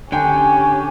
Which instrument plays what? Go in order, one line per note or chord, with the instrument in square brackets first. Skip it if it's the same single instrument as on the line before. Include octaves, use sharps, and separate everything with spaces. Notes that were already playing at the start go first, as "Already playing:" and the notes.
[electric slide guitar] D3 [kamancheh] C#4 G4 [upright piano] G5 [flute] G#5